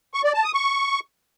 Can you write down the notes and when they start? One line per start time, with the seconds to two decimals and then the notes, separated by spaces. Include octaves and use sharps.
0.14 C#6
0.24 D5
0.34 A5
0.44 D#6
0.54 C#6